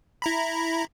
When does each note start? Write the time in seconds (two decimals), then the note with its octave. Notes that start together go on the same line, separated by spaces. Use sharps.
0.22 E4 A#5 B5